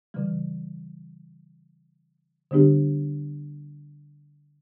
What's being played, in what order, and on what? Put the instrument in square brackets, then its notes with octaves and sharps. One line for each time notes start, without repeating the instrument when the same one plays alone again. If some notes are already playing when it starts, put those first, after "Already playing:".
[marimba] C#3 E3 G3
D3 G3 B3 D4 G4